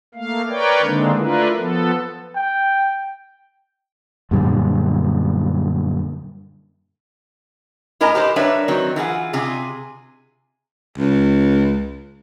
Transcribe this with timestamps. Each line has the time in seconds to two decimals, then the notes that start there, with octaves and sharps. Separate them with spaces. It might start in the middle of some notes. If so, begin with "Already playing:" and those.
0.15 A3 A#3 F5
0.49 A#4 B4 C#5 D5 G5
0.82 D3 D#3 G#3 A#3 C4 D4
1.17 A3 D4 E4 F4 A#4 B4
1.57 F3 B3 A4
2.36 G5
4.31 F#2 A#2 D3 G3
8.00 A2 E4 A#4 D#5 G#5 A#5
8.15 G4 B4 C5
8.36 G3 D4 A#4 B4 C#5 E5
8.68 D#3 F#3 C4
8.96 E3 F4 G#4 F#5
9.33 C3 F4 G#4
10.98 C#2